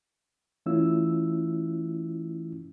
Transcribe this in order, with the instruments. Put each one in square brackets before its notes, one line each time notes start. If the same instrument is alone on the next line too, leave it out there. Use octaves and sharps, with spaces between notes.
[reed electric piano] E3 A3 C#4 E4 F4 E6